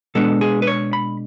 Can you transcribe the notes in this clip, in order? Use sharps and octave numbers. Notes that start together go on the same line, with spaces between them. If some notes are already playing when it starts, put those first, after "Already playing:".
B2 G#3 B3 D4 A4
G#4
B4
C#5
B5